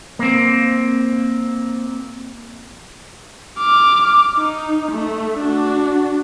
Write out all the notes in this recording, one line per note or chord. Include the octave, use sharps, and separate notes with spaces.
A#3 C4
D6 F6
D#4
A3
D4 F#4